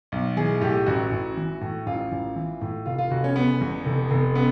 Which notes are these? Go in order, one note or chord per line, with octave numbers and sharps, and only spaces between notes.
B1
E3 G#4
A2 G4
A1 F#4
A1
E3
A2
A1 F4
A1
E3
A2
F1 F4
F4
F1 F#4
C#4
C#3 B3
E2
F1
F1
C#3 B3